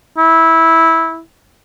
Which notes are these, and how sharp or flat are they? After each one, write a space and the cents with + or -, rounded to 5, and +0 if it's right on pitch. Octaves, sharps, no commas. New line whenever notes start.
E4 -15